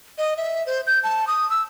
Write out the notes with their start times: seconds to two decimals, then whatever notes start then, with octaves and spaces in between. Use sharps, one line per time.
0.18 D#5
0.37 E5
0.67 C5
0.87 G6
1.03 A5
1.27 D#6
1.50 E6